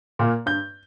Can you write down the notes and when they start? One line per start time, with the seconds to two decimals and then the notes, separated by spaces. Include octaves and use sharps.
0.19 A#2 A#3
0.46 G2 G6